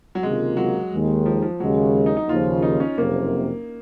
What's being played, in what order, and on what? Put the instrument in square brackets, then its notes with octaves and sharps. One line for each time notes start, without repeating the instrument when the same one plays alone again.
[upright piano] F#3
[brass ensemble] C#2 C3 D#3 A#3 F4 [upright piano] G#3
[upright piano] F#3
[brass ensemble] D#2 D#3 G#3
[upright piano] F3
F3
[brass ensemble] D#2 C#3 G#3 [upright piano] F#3
[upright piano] D#4
D#4
[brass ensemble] D#2 C#3 F3 [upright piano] F4
[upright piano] D#4
C#4
[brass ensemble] F#1 F2 C3 [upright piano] A#3